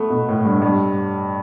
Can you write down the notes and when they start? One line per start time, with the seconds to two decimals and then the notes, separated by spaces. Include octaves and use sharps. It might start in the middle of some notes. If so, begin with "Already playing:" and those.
Already playing: A3 B3
0.10 B2
0.28 A2
0.45 G2
0.62 G2